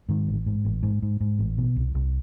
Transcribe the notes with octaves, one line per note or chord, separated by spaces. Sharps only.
G#2 D#3
A1
G#2
A1
G#2
G#2
G#2
A1
B2
C2
C2